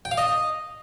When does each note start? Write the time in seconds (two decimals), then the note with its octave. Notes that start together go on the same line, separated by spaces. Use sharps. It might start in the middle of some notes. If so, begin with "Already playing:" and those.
0.05 G5
0.11 F5
0.18 D#5